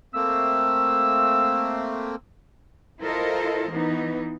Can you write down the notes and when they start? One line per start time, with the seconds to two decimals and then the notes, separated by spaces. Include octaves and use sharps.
0.14 A3 A#3 C4 E6
3.01 E4 F4 A4 A#4 C5 D#5
3.69 E3 B3 D#4